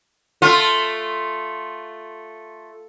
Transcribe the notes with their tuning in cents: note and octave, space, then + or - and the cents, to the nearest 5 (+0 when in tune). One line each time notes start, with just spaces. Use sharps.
A3 +0 F4 +0